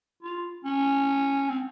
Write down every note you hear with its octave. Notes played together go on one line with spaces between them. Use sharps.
F4
C#4
C4